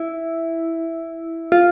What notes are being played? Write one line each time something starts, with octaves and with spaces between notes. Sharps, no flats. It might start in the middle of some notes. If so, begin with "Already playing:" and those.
Already playing: E4
F4